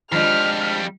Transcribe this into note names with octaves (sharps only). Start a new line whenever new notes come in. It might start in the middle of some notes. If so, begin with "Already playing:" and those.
F2 F3 G3 G#3 D4 F6